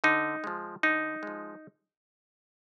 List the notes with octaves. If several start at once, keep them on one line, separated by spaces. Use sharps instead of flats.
D3 D#4
F3 G#3
D3 D#4
F3 G#3